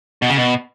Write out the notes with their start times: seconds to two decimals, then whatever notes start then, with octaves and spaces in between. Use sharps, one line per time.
0.22 B2
0.30 C#3
0.37 B2